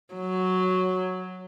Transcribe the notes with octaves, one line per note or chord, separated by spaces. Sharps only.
F#3